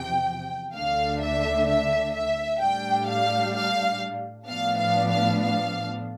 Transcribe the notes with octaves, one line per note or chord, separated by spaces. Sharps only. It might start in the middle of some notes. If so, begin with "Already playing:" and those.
Already playing: E2 C3 F3 G5
D2 D3 A3 D4 F5
E5
E5
E5
A2 G3 D4 G5
F5
F5
A2 F3 B3 D4 F5
F5
F5
F5